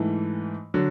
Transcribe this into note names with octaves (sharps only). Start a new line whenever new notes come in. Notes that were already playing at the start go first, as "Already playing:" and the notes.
Already playing: G#2 E3 A3
D3 F#3